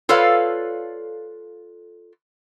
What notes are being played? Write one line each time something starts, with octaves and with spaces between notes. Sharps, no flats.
F4 A4 B4 C#5 D5 F5